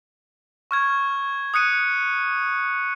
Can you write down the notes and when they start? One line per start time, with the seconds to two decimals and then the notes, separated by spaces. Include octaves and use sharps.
0.71 C#6 F6 G#6
1.54 D#6 F#6 C#7 D#7